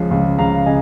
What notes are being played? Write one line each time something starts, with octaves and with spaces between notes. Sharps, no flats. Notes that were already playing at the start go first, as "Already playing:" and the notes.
Already playing: C#2 C#3 F3
C#2
C#2 F5 A#5
C#3 D#5 G#5